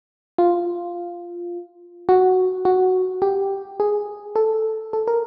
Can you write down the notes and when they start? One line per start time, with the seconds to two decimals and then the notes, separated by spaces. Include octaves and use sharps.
0.38 F4
2.09 F#4
2.65 F#4
3.22 G4
3.80 G#4
4.36 A4
4.93 A4
5.08 A#4